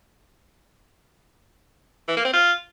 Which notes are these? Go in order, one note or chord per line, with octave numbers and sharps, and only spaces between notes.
E3
A#3
C4
F4